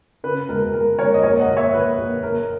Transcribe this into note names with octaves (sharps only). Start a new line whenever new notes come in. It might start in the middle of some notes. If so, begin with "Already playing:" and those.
C#3 B4
E1 A#4
E1 A#4
E1 A#4 C#5
D#5
A#1 A#4 C#5
D#5 F#5
A#1
C#5 E5
A#1 B4
A#1
F#1 A#4